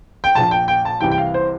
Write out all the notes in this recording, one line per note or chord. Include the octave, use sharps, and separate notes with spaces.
G5
A#1 A#2 F3 A5
G5
G5
A5
C2 C3 E3 G5
G5
F5
C5